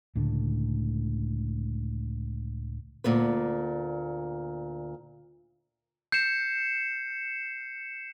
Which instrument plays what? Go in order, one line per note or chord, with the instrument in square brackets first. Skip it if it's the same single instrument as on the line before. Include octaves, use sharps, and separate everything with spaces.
[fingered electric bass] C#2 A2 D3 A3
[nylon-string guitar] D2 A#2 B3 B4
[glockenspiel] G6 [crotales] C7 C#7 E7